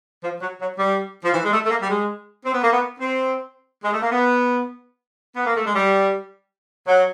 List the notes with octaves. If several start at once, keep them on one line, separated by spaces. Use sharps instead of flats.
F3
F#3
F#3
G3
F3
E3
G#3
A3
A3
A#3
G3
G#3
C4
B3
A#3
B3
C4
G#3
A3
A#3
B3
B3
A#3
A3
G#3
G3
F#3